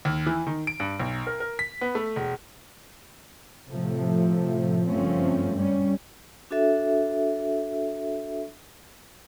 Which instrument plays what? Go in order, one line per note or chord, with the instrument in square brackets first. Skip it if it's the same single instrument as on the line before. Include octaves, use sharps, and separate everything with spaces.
[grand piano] D#2
E3
D#3
D7
G2
B1
A#4
A#4
B6
B3
A3
E1
[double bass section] A2 C3 F3 A3
F#1 G2 F3 A3 C4 C#4
G3 C#4
[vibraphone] D4 F#4 A4 E5